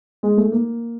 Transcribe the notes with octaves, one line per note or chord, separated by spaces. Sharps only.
G#3
A3
A#3